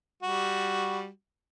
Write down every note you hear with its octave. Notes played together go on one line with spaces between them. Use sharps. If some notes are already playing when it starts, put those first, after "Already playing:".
G3 F#4